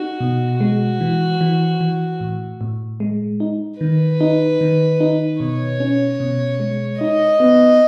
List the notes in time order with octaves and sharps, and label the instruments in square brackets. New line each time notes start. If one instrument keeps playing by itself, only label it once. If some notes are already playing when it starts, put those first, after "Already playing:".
Already playing: [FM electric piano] D#4 [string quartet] F#4
[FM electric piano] B2
[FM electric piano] G#3 [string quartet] F#4
[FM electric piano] E3
E3
E3
A2
A2
G#3
D#4
[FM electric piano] D#3 [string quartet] B4
[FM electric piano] D#4
D#3
D#4
[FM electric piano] B2 [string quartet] C#5
[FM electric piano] C#4
B2
G#3
[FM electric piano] D#4 [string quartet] D#5
[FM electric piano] B3